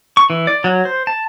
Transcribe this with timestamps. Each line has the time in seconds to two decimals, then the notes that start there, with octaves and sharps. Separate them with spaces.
0.17 C#6
0.30 E3
0.47 D5
0.64 F#3
0.85 C5
1.07 A5